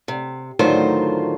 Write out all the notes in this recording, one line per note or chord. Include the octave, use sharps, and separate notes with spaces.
C3
D2 A2 D#3 F#3 F4 C5